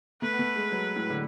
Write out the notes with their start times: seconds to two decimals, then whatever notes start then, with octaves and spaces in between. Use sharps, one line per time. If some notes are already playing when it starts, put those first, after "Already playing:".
0.22 A3 B4
0.33 B3
0.39 A3
0.56 G#3
0.72 F#3
0.96 A2
1.10 D3